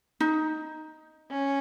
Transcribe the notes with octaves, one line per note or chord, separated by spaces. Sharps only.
D#4
C#4